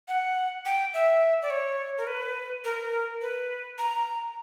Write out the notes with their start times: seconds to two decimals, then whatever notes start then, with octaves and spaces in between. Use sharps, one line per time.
0.08 F#5
0.65 G5
0.94 E5
1.42 D5
1.50 C#5
1.98 A#4
2.07 B4
2.64 A#4
3.22 B4
3.78 A#5